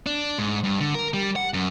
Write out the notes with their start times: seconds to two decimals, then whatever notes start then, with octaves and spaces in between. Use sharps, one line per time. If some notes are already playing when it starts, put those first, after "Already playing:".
0.06 D4
0.38 G#2
0.64 G2
0.80 D3
0.95 A#4
1.14 G3
1.36 F#5
1.54 F#2